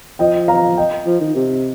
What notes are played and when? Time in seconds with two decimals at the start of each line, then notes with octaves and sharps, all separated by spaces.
0.19 F3 D#5 G5
0.48 F5 A#5
0.77 D#5 G5
1.06 F3
1.21 D#3
1.36 C3